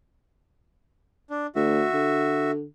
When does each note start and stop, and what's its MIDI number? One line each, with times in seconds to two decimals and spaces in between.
1.30 1.47 62
1.55 1.85 38
1.55 2.51 66
1.55 2.51 76
1.94 2.65 50